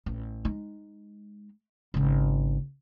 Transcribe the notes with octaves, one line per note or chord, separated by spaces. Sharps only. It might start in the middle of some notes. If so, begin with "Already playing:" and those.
A1
G#3 D#4
G#1 C#3